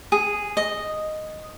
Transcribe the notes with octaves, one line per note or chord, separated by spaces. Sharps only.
G#4
D#5